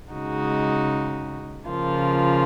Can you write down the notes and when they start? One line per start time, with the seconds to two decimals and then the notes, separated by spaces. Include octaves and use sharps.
0.13 C#3 G#3 D#4 F#4
1.68 C#3 F3 A#3 F4